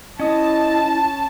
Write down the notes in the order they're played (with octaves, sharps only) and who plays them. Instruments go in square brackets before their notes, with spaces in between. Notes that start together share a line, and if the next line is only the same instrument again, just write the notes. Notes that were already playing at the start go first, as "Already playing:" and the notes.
[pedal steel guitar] C#4 D#6 [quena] E4 [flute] D#5 [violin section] A5